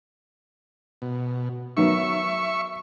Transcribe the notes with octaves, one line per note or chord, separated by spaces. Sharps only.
B2
D#3 F#3 B3 E5 C#6